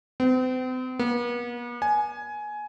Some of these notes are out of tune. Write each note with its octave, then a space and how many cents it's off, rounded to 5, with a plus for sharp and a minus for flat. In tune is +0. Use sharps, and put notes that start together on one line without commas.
C4 -40
B3 -45
G#5 +15